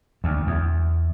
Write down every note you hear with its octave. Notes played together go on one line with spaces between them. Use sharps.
D2
E2